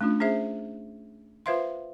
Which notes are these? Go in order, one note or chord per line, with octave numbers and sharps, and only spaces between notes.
A3 C#4 D4 F4
C#4 G#4 C5 E5
F4 B4 C5 E5 F5 C6